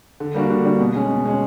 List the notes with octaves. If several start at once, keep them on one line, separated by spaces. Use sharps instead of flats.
D3
G3 A#3 D4 F#4
D3
G3 A#3 D4 F#4
B2
G#3 C#4
B2
G#3 C#4